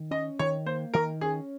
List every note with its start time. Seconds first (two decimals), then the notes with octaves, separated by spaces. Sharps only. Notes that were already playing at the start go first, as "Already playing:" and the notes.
Already playing: D#3
0.11 C#4 D#5
0.39 D#3 C#5
0.66 A#3 C5
0.94 D#3 A#4
1.21 C#4 G#4